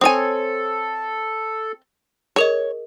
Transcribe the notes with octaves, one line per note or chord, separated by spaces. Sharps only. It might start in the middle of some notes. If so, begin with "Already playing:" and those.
C4 A4 C#5 G#5 D#6 D#7
G#4 A#4 C#5 D#5